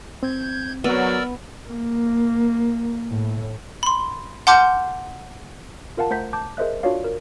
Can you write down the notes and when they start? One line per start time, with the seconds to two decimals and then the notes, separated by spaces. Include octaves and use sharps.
0.23 C4 G6 G#6
0.84 F#3 B3 A#4 D5 E6
1.69 A#3
3.10 A2
3.83 B5 C6
4.47 F#5 A5 C6 D6 F6 G6
5.97 F4 A#4 F5 F#5 A5
6.10 A3 C5 F#5 A#5 G6 B6
6.33 A5 D6 G6
6.57 G#4 A#4 C5 D#5 E5 F#6
6.83 D4 F4 F#4 C#5 D5 F5
7.04 A#4